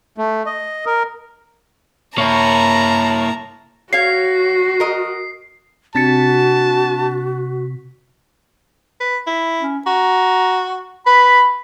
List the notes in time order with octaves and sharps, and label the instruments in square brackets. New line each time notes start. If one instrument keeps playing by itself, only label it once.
[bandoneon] A3
D#5
A#4
[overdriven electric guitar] A#3 E4 [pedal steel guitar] C#5 G5 [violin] A5 A#5
[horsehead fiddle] F#4 [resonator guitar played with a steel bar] C#5 F5 [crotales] C7
[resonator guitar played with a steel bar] A#4 D#5
[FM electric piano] C3 B6 [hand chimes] D4 A6 C#7 [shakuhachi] F#4 [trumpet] A5
[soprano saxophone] B4
E4
[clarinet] C#4
[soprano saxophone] F#4 [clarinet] A#5
[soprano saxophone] B4 [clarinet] B5